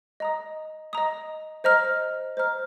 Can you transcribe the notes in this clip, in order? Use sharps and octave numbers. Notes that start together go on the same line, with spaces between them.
D#5 A#5 D#6
D#5 A#5 D#6
C5 D#5 A#5 F6
C5 D#5 A#5 F6